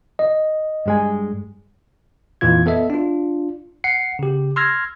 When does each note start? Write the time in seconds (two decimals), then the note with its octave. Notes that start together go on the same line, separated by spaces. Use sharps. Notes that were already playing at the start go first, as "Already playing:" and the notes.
0.19 D#5
0.86 G2 G#3 G#5
2.41 F2 A#2 E3 F4 G#6
2.66 B3 A4 D#5 E5
2.90 D4 F4
3.84 F#5 C7 C#7
4.19 C#3 G4
4.56 C6 E6 F6 G#6 A#6